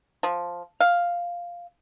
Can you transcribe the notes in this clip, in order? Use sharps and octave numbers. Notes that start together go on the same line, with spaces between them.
F3
F5